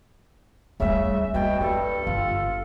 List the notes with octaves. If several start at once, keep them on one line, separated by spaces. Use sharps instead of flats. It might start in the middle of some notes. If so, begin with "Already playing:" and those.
C#3 G3 A3 E5
B2 G3 A#3 G5
G2 E4 A4
G1 F4